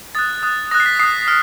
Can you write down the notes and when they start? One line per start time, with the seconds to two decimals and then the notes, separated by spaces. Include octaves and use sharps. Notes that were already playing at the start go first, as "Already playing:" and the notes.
0.15 D#6 F#6 A6
0.43 D#6 F#6
0.71 D#6 F#6 A#6
0.80 C7
0.86 B6
0.99 D#6 F#6 C7
1.28 F6